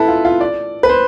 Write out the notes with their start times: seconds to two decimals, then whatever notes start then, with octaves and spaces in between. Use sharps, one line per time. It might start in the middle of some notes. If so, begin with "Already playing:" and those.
Already playing: E4 A4 B4
0.08 F4
0.25 F4
0.41 D5
0.83 B4
0.89 C5